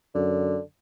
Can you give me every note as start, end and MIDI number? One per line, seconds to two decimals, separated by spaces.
0.15 0.57 42
0.15 0.60 50